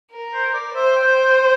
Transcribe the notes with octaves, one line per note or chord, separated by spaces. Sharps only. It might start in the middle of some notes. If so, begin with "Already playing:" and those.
A#4
C5
D5
C5 E5
G5
C5
G5